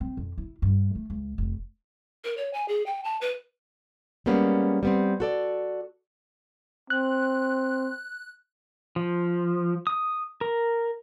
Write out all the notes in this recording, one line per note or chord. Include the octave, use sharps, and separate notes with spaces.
C4
F2
E4
G2
A3
C#2
F1
A#4
C#5
G#5
G#4
G5
A5
B4
G3 G#3 A#3 B3 C#4
G3 B3 C4
F#4 A4 D5
C4 F#6
F3
D#6
A#4